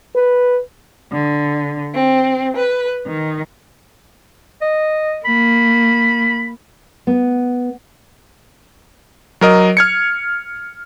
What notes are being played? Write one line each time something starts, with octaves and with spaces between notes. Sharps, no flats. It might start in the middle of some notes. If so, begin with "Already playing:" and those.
B4
D3
C4
B4
D#3
D#5
A#3 B5
B3
F#3 A#4 D#5
F6 G#6 C#7